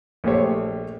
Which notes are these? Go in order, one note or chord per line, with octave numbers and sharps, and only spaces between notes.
A#1 A3 G4 C5 C#5